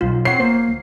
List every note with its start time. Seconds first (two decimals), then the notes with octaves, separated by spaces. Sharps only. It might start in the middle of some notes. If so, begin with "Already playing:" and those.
0.01 B1 F4
0.25 C4 C#5 F#5 C7
0.40 F1 A#3 C5
0.69 D2